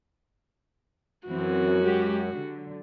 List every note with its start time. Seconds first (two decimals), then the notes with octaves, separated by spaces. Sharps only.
1.28 F#2 E3 C4 F#4
1.81 G#3 G4
2.28 D3 F#3